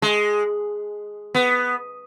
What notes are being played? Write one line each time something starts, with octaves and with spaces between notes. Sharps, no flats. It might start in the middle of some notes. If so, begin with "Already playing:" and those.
G#3
B3